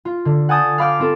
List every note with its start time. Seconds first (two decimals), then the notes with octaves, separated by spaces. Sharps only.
0.05 F4
0.25 D3
0.49 F#5 G#5 A5 D#6 G6
0.78 F5 B5 D6 F6 G6
0.99 C4 F4 A4